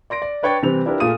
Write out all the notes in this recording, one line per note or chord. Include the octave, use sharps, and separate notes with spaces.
D5 C6 A#6 D7
D5
D4 B4 C#5 G5 C#6 A6
C3 E3 G3 C4 B4 F7
D4 E4 F4 G4 A#4 B4
A#2 A3 A#3 G#4 D#6 D#7